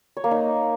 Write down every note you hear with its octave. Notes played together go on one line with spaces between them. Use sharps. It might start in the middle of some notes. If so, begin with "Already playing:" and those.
C#5
A#3
D#4